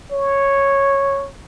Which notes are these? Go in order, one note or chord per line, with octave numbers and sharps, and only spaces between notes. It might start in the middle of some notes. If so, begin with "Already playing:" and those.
C#5